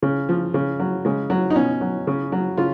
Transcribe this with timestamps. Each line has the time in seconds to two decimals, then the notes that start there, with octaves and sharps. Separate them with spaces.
0.02 C#3
0.29 F3
0.54 C#3
0.79 F#3
1.05 C#3 G#3
1.30 F#3
1.50 D#4
1.56 B2 C#4
1.81 F#3
2.07 C#3
2.32 F#3
2.57 C#3 F4